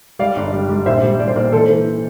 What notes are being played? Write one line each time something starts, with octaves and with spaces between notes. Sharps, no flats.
G3 D5 F5
G1
G3
G3
A#1 C5 E5
G3
G3 D5
C5
A#2 A#4 D5
E3 A4 C5
E3